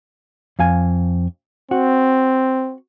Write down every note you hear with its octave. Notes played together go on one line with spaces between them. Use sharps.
F2 F5 G#5
C4 F#4